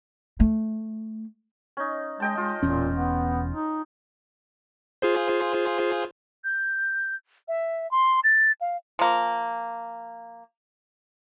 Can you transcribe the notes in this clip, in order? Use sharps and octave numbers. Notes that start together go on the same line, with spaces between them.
A3
C#4 D#4
G#3 D#5 G5 A5
G#3 F4
E1 E2 A#2 C#4
B3
D#4
F4 G#4 C5
G6
E5
C6
A6
F5
F3 A#3